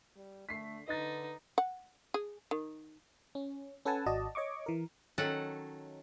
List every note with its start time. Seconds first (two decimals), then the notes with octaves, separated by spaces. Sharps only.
0.16 G3
0.49 D3 A3 B6 C7
0.88 D3 D#4 B4 D#5 A6
1.58 F#5
2.14 G#4
2.51 D#3
3.35 C#4
3.85 C#4 A4 B4 F#5 G#5 A5
4.06 G#1 F#4 D5 D#5 A5
4.35 C#5 D#5 C#6 D6
4.66 E3 A#4
5.18 D#3 F#3 C#4 A4 F#5